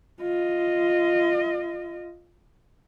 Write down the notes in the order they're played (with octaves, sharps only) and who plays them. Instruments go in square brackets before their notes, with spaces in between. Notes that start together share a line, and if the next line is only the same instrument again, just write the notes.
[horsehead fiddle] F4 D#5